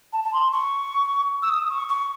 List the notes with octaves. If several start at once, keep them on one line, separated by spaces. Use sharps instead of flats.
A5
A5
C6
C#6
E6
D#6
C#6
C#6